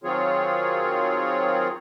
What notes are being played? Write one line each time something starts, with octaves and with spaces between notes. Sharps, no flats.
D#3 F#3 C4 F4 G#4 C#5